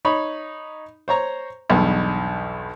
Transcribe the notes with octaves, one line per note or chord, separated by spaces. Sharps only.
D#4 C#5 B5
C5 C#5 A#5 C#6
B1 E2 G2 B2